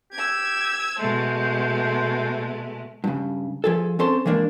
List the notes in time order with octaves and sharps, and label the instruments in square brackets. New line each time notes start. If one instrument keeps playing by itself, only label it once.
[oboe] G4 [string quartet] E6 G#6
[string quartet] B2 G#3 A3 [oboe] C5
[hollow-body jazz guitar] G2 C#3
F3 G#4 A4
C4 C#4 A4 C5 A5 C6
E3 G#3 A#3 D4